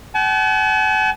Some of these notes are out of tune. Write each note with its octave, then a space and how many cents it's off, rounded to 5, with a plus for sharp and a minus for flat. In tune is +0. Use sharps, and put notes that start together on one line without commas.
F#5 +45 A5 -45